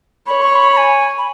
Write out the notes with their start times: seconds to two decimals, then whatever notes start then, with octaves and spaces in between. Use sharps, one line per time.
0.27 C#5 B5
0.41 C#6
0.55 B5
0.72 B5
0.77 G#5
1.18 B5